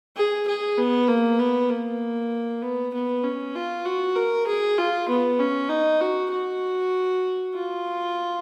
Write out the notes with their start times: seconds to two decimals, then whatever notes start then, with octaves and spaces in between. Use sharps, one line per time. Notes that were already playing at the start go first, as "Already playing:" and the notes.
0.17 G#4
0.47 G#4
0.78 B3
1.08 A#3
1.39 B3
1.70 A#3
2.62 B3
2.93 B3
3.24 C#4
3.55 F4
3.85 F#4
4.15 A#4
4.47 G#4
4.78 F4
5.09 B3
5.39 C#4
5.69 D#4
6.00 F#4
6.31 F#4
7.55 F4